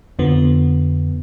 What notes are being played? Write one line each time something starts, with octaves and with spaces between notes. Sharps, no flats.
F2 D3 F3 B3